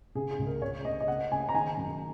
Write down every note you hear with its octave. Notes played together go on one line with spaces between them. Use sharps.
C#3 G#4
G#4
C#2
A#4
C#3 C#5
C#3 D#5
D#5
C#3 F#5
C#3 G#5
A#5
D#3 G#5
F#2